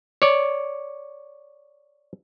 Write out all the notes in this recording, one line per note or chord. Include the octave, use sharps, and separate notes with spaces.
C#5 D5